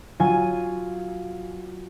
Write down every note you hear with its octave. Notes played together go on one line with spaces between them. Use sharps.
F#3 F4 G#5 G#6 D#7